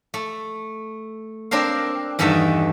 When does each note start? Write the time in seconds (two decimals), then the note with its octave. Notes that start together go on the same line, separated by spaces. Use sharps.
0.14 A3
1.51 C4 D4 A#4 C5 F5
2.19 E2 G2 D#3 A3 A4 E5